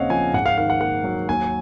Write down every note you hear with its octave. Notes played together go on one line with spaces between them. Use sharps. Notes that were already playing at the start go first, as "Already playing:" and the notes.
Already playing: D#2 C#3 C4 C#5 D#5 F5 F#5
F3 G#5
G#2 F#5
F5
D#3 F5
F#5
A#3 F#5
F#3
D#2 G#5